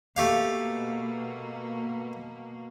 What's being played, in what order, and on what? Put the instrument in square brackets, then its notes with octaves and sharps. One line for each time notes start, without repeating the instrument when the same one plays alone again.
[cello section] B2 A#3 [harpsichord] A3 G4 F5